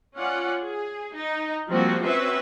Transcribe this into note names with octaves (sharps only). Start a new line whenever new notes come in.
C#4 F4 D5 F#5
G#4
D#4
F3 G3 A#3 C4 F4 F#4
C4 C#4 F#4 B4 C5 E5